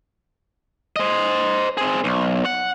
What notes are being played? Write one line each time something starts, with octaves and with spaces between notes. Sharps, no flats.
C5 D#5
C4 G#4
B1
F#5